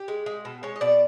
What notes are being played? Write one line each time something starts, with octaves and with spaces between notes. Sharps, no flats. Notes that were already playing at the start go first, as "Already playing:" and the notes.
Already playing: G4
G#3
G#3
B2
G#3 C#5
D#5
B2 D5